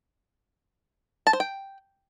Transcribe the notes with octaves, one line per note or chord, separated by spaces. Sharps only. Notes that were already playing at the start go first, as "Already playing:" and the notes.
A5
C5
G5